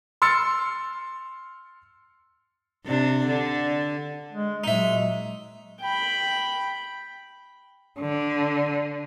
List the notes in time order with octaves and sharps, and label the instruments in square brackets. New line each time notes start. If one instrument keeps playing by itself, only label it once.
[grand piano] C6 E6 F6 A6 C#7
[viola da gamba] C3 D4
D3
[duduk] G#3
[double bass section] A#2 F#3 [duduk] G#3 [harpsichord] D#4 E5
[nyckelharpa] G5 B5
[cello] D3